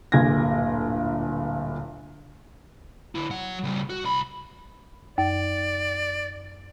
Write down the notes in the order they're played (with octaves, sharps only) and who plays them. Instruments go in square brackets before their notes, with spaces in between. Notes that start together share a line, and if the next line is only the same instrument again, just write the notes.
[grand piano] D1 G1 A#2 G#4 G#6 A#6
[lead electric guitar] D3 E4
F#3 F#5
C#3 G3
F#4
C2 B5
[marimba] F#2 [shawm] D5